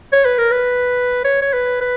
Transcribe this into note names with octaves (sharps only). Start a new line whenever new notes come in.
C#5
B4
A#4
B4
C#5
C#5
B4
B4